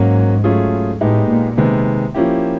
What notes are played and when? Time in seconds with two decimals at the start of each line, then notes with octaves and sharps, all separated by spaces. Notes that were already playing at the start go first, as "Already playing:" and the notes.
Already playing: G#2 F#3 A#3 C#4 F#4
0.44 F#3 A3 C#4 F4 G#4
1.01 A2 G#3 B3 D#4 G4
1.29 A#2
1.57 C3 D#3 G#3 B3
2.15 F3 A#3 C#4 E4 G4